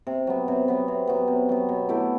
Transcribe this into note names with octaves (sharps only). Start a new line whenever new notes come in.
C3
F#3 B3
C3
F#3 B3
C3
F#3 B3
C3
F#3 B3
B2
A3 E4 G4